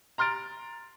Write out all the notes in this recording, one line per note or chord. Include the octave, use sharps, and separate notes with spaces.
A#5 C6 F6 A6 D7